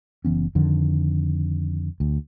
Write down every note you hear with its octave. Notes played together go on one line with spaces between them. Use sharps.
F#1 E3 B3 C#4
F2 D3 D#3 F3
D2